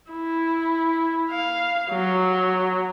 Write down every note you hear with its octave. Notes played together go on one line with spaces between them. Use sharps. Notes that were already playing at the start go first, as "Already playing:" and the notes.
E4
F5
F#3